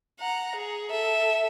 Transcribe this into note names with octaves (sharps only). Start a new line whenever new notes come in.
F#5 A#5
G#4
A4 E5